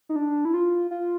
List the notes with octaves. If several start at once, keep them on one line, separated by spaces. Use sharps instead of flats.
D#4
D4
E4
F4
F4